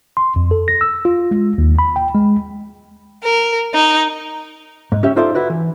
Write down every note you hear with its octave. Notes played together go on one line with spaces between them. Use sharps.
C6
F2
A4
A#6
E6
F4
G#3
D#2
B5
G5
G#3
A#4
D#4
G#2
C#4 G4 E5
D#4 F4 A4 C5 D5 E5
E4 F#4 B4 D5
E3